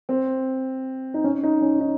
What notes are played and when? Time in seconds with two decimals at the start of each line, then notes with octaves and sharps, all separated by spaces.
0.09 C4
1.14 D#4
1.24 C#4
1.43 D#4
1.62 C#4
1.80 D#4